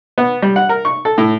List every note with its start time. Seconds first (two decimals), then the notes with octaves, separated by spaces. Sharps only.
0.18 B3
0.42 G3
0.56 F#5
0.69 A#4
0.85 C#6
1.05 A4
1.18 A2